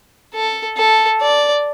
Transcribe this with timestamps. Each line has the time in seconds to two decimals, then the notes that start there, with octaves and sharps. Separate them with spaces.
0.35 A4
0.77 A4
1.21 D5